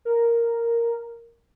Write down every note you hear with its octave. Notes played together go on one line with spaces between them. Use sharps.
A#4